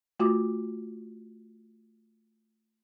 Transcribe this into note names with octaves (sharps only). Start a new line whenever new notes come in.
A3 F4 F#4 D6